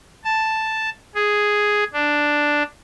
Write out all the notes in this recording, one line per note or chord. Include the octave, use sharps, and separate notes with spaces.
A5
G#4
D4